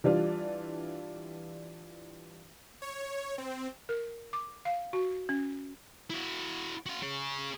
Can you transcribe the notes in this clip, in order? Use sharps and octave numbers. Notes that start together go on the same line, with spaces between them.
E3 G3 D4 F4
C#5
C4
A#4
D6
F5
F#4
C#4
E4 F#4
F#4 F5
G#4 C#5